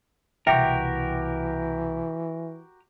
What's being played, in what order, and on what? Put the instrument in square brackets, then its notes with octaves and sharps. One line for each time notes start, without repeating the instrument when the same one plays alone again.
[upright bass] C2 B2 [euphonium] E3 [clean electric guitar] F#4 G4 A#4 [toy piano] E5 G5